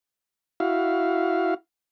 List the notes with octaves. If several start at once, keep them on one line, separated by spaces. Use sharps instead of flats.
E4 F#4 F5